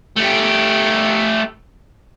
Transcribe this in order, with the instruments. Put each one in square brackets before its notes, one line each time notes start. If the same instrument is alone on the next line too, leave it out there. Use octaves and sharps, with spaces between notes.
[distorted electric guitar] A3 G4